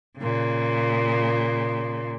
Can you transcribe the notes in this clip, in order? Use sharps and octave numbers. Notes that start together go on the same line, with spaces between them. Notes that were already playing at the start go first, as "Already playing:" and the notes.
A#2 C#3